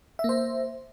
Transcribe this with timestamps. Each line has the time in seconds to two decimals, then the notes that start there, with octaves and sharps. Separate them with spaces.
0.19 E5
0.24 A#3
0.29 C5